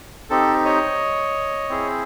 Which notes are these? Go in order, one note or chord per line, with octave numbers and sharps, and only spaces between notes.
C4 D#4 G4 A4
C#5 D#5
C4 E4 G#4